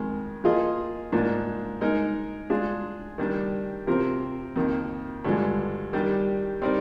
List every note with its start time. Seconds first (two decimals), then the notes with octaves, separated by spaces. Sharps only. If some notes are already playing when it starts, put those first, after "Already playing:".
Already playing: F2 D#3 G#3
0.44 F3 A#3 F4 G#4 D#5
1.12 G#2 F3 A#3 D4
1.81 G#3 D#4 A#4 D#5
2.50 G#3 D4 F4 G#4
3.18 D#3 G3 D4
3.87 C3 F3 C4 G4 A#4
4.56 F2 D#3 A#3
5.25 G2 D3 F3 G#3
5.93 D#3 G3 D4 G4
6.62 G3 C4 D#4 A#4 D5